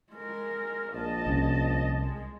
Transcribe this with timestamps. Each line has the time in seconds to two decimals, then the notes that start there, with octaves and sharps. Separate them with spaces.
0.11 G#3 A#4
0.94 A#1 D#5 A5
1.26 C2 C#4
2.01 G#3